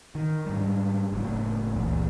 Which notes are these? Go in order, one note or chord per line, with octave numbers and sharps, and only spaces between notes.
D#3
G#2 G3
F#1 F#2 A2
G1 C#2 A#2 E3